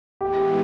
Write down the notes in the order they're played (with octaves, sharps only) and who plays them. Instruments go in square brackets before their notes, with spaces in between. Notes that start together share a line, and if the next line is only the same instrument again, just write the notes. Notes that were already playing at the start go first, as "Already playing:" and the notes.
[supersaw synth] A2 E3 G#3 B3 [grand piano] G4